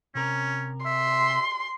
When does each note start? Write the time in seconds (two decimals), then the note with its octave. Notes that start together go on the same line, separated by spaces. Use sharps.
0.15 C3 C#4 A#4
0.86 E5 C6